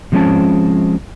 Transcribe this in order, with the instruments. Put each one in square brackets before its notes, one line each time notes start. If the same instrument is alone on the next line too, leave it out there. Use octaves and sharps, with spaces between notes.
[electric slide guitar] B2 F3 G#3 C4 C#4 A5